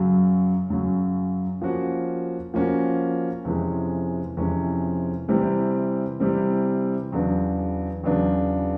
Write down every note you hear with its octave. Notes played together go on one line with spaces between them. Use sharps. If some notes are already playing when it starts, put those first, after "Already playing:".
Already playing: F#2 C#3 F#3
F#2 C#3 F#3
F3 A#3 C#4 F#4
F3 A#3 C#4 F#4
F2 C3 E3 G#3 C#4
F2 C3 E3 G#3 C#4
C3 E3 G3 C4
C3 E3 G3 C4
E2 C#3 F#3 B3 D4
E2 C#3 F#3 B3 D4